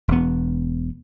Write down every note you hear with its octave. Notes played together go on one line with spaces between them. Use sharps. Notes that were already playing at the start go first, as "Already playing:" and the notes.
E1 B3